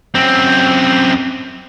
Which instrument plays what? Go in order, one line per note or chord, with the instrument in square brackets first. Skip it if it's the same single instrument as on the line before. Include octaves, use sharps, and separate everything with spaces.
[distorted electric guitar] F#2 C4